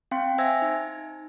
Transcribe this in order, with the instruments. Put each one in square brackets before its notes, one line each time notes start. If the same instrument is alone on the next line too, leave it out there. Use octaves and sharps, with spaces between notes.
[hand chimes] C4 F5 G5 C6
C5 E5 G#5 E6 G#6 A#6
D#4